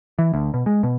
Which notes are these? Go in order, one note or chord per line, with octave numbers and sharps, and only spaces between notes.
E3
D2
B2
G#3
B2